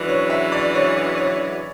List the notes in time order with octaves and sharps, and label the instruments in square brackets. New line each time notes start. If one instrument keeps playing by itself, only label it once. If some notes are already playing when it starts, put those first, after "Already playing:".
Already playing: [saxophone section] F#2 E3 G#3 D4 F#4 [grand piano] B4
[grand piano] C#5
E5
D5
C#5
C#5